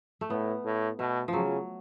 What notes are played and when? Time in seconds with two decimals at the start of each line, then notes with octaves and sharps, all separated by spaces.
0.21 A3
0.30 A2 B3
0.65 A2
0.99 B2 A3
1.28 F3
1.33 C#3 F#3